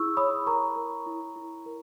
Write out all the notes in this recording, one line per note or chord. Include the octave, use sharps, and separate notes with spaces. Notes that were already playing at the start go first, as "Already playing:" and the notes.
Already playing: E4 G#4 C#6 E6
C#5 B5 D#6
A#4 A#5 C#6
A#4
E4
E4
A#4